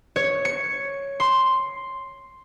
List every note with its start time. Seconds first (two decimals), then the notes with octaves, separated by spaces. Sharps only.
0.16 C#5
0.45 C#7
1.20 C6